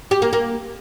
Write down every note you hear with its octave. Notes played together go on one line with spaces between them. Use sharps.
G4
A#3
A#3